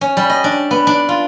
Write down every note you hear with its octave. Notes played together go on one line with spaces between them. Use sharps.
C#4
G3
D#5
D4
B3
D4
F4